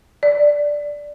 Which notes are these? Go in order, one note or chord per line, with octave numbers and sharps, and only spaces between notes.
D5